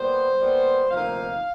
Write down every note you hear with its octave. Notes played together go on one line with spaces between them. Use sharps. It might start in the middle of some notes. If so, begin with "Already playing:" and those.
Already playing: A#2 G3 B3 C5
A#2 G3 B3
D2 C3 F3 A#3 D#4 F5